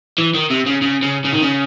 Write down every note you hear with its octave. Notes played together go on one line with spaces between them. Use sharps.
E3
D#3
C3
C#3
C#3
C#3
C#3
D#3
C#3